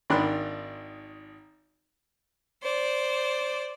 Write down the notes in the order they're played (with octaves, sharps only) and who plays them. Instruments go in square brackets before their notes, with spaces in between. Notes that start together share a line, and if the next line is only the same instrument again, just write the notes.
[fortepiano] G#1 D#3 D4 B5 C6 F#6
[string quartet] C5 D5